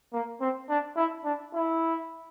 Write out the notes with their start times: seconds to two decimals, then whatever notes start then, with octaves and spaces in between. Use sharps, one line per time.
0.13 A#3
0.40 C4
0.69 D4
0.96 E4
1.24 D4
1.54 E4